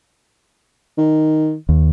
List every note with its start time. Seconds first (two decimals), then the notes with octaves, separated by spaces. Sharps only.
0.98 D#3
1.69 D#2